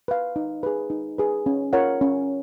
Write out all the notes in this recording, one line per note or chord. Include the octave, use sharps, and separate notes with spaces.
B4 F5
D#4
G#4 B4
D#4
G#4 B4
C#4
F4 A#4 C#5 F#5
C#4